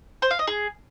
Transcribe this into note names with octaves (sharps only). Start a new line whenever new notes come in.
C5
F5
D#5
G#4